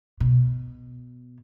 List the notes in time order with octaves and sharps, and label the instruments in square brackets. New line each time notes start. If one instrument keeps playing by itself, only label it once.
[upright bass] B2